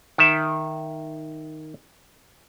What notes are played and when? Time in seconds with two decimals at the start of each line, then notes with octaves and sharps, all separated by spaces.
0.18 D#3 E5